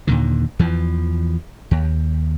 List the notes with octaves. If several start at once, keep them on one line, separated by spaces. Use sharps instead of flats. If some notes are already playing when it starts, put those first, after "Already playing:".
D#2 A#2 D3 D#3
E2 E3 F3
D#2